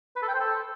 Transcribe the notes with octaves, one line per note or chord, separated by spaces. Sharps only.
B4
A4
G5
C5
A4